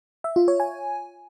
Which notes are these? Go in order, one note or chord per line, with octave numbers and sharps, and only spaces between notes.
E5
F4
C#5
G#5